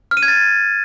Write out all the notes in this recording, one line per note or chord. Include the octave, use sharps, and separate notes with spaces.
F6
D#7
G#6
A6